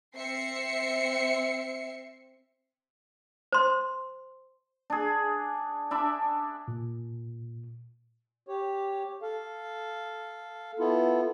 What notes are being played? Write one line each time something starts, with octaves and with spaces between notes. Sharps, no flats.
C4 E5 C7 C#7
C5 C6
D4 G#4
D4 E5 B5 D6
A#2
G4 C#5
A4 F5
B3 E4 F4 A4